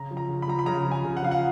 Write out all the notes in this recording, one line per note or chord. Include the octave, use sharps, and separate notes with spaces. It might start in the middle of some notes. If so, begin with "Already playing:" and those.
Already playing: C#3 A#5
F3
A#5
C#3
B5
F3 A#5
B5
C#3 A#5
F3
G#5
C#3
F#5
F3 F5
F#5